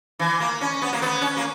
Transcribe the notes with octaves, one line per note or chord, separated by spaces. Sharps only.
E3
A#3
C#4
B3
A#3
B3
C#4
A#3